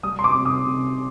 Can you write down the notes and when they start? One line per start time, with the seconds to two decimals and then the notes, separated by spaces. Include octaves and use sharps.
0.03 G3 D#6
0.19 C6
0.24 D6
0.34 C3
0.45 D#6
0.66 C3